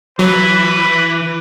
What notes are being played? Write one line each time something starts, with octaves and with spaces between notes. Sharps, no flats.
E3 F#3 B4